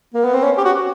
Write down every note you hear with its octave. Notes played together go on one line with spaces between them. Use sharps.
A#3
B3
C4
C#4
G4
F#4